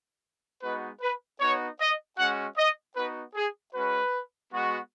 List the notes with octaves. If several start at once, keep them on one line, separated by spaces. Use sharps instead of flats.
G#3 B3 D#4 F#4 B4
B4
B3 D#4 F#4 C#5
D#5
G#3 C#4 F#4 F#5
D#5
B3 D#4 F#4 B4
G#4
G#3 C#4 F#4 B4
G#3 B3 F#4